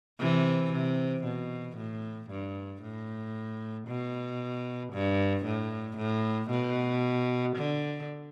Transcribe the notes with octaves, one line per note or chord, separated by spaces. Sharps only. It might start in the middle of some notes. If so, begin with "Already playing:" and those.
C3 E3
C3
B2
A2
G2
A2
B2
G2
A2
A2
B2
D3